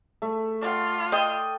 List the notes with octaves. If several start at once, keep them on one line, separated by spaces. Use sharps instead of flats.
A3 E5
F4 D5 F5 F#5
D#5 G5